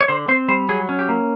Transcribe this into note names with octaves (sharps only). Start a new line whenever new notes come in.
C#5
D3 C5
C4 C5
G3 C5
F#3 G#4
C#4
G4
A#3